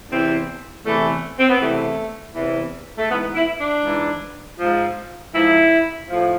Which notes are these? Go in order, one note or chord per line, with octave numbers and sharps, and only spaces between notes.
E2 C3 E3 C4
E2 C3 E3 A3
C4
B3
E2 C3 E3 A3
E2 C3 E3
A3
G#2 E3 B3
E4
D4
G#2 E3
G#2 F3
G#2 F3 E4
A2 F3